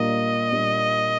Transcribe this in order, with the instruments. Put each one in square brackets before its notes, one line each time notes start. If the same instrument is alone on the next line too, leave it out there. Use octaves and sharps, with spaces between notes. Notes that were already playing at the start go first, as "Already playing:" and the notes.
Already playing: [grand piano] A#2 G3 A#3 D4 [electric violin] D#5
[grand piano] A#2 G3 A#3 D4